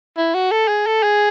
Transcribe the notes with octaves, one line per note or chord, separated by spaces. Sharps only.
E4
F#4
A4
G#4
A4
G#4